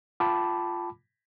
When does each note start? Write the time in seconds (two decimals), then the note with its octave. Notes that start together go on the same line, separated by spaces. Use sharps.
0.20 F4 G5 A5 B5 D6